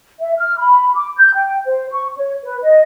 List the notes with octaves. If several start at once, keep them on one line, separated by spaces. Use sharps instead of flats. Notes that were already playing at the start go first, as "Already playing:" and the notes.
E5
F6
B5
D6
G6
G5
C5
C#6
C#5
B4
D#5